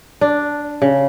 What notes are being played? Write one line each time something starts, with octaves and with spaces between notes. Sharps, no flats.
D4
C#3